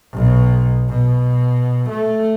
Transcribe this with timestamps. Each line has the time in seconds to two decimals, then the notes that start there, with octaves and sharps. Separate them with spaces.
0.13 B1 B2
0.90 B2
1.90 A3